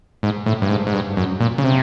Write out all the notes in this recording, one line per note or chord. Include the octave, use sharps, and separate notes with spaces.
G#2
A2
G2
G#2
G#2
G2
F#2
A#2
C#3
C3